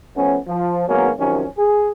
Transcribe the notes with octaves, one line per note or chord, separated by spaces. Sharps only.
F3 A3 B3 C#4
F3
G#1 F#2 F#3 A#3 B3 C#4
F#2 C3 D#3 F3 C#4
G#4